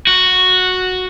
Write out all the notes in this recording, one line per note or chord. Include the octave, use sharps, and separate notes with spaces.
F#4